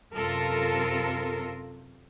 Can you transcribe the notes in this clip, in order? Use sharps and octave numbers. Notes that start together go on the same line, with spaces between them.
F#2 C3 F4 A4 A#4